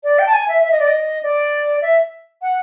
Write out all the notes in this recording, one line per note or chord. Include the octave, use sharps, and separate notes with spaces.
D5
G5
A5
G#5
E5
E5
D#5
D5
D#5
D5
E5
F#5